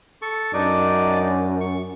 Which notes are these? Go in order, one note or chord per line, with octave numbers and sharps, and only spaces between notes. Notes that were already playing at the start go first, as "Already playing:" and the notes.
A4 C#6
F#2 D4 D#4 D5
C#6